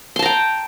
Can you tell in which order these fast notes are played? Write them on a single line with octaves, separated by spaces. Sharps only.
C6 A5 A#5 G5